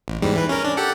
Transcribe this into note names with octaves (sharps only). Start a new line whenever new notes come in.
A1
E2 G#2 G3
E3 B4
C#4 A#4
D4
G4 A4 F#5